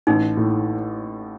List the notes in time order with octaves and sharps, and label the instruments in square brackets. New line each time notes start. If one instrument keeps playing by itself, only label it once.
[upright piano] A1 [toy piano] D#4
[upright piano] A2